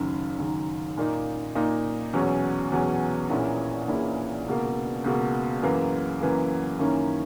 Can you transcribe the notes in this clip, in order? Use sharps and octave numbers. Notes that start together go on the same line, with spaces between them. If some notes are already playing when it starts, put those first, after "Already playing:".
Already playing: F#1 F#2 D#3
F#1 F#2 D#3
A#2 A#3 D#4
A#2 A#3 D#4
E2 B2 F#3 C#4
E2 B2 F#3 C#4
A#1 A#2 A#3 C#4 E4
A#1 A#2 A#3 C#4 E4
C#2 B2 A#3
C#2 B2 A#3
F#2 E3 A#3
F#2 E3 A#3
F#2 D#3 A#3 C#4 E4